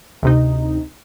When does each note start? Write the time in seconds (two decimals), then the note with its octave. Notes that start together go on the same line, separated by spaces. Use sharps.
0.23 D2 C3 D#4